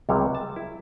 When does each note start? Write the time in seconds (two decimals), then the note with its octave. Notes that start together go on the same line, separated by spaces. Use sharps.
0.09 C#2 C3 F#3 G3 C#5
0.35 A5
0.56 E4